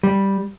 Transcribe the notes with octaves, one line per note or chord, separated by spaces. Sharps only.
G3